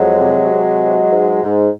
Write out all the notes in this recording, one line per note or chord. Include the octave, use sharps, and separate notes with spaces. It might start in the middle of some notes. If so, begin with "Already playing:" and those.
Already playing: F2 F#3 G#3
C3
C3
E3
G#2
G#2